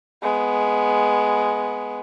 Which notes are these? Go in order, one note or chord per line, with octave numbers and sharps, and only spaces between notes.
G#3 B3